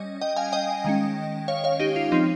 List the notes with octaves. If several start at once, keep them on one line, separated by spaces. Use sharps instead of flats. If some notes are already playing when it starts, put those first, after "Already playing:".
Already playing: G3 C#4 D#5
D#5 G5
F5 G#5
D#5 G5
D#3 G#3 C#4
C#5 F5
C#5 F5
D#4 G4
F4
F3 C4 D#4